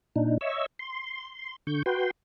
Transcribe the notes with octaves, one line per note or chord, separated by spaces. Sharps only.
A#2 D4 D#4
C#5 D#5 E5 C#6 E6
C6
D3 C#6 G6
F#4 B4 G5 C6